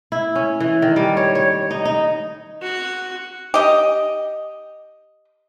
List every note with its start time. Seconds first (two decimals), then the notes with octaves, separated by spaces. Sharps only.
0.12 E4
0.36 C#4
0.60 E3
0.82 D#3
0.96 G3
1.17 C#5
1.35 C#5
1.71 D#4
1.85 D#4
2.62 F#4
3.54 G4 D#5